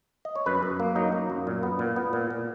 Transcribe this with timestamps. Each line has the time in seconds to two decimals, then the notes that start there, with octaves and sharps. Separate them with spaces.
0.25 D#5
0.36 C#5
0.46 F#2 B4
0.63 F#2
0.80 A#3
0.96 F#3 D#4
1.12 A#3
1.30 F#2
1.47 A#2
1.63 B3
1.79 A#2
1.96 B3
2.13 A#2
2.30 A#2